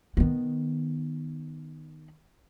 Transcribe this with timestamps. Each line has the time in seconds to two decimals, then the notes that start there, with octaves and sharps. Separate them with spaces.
0.17 D#3 B3